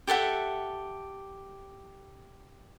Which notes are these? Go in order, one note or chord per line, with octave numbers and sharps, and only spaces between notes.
G4 A4 E5 F#5